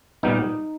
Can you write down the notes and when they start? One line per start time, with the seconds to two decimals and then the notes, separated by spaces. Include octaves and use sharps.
0.23 A#2 G3 B3 D#4